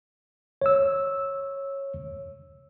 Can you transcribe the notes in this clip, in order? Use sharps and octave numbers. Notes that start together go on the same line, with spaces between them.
C#5 E6